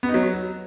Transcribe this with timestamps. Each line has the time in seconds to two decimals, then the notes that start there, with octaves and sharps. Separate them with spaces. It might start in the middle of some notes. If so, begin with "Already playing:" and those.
0.03 B3
0.09 D#4
0.14 F#3